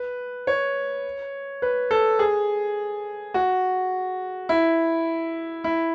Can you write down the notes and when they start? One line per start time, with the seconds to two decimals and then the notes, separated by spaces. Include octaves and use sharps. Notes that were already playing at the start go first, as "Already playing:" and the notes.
Already playing: B4
0.47 C#5
1.62 B4
1.91 A4
2.19 G#4
3.34 F#4
4.49 E4
5.64 E4